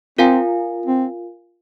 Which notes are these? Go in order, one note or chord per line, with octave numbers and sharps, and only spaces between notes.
C4 F4 A#4 F5 G#5
C4